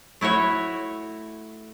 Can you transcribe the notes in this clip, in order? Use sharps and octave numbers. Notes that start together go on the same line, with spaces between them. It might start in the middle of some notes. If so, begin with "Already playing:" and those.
A3 E4 F#4 C#5